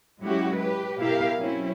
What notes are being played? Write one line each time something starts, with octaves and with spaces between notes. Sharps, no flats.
F#3 G#3 C#4 E4 F#4 G4
G4 B4
B2 E4 G4 A#4 F5
F#3 C4 C#4 E4